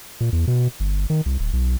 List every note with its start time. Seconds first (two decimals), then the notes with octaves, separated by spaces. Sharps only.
0.20 A#2
0.32 E2
0.47 B2
0.80 G1
1.10 D#3
1.26 C2
1.39 D1
1.53 B1